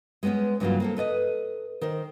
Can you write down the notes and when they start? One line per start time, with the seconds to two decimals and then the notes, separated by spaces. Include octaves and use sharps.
0.23 G#3 A#3 B3 C#4 G#4
0.60 G2 C#3 E3 F#3 A#3 F4
0.80 A#3 C4 A4
0.97 A4 B4 D5 D#5
1.81 D#3 A#4 C5